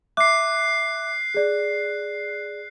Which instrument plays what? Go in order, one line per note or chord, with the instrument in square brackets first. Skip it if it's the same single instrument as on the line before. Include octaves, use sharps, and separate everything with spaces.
[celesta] E5 D6 [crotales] F#6 C7
[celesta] G#4 D5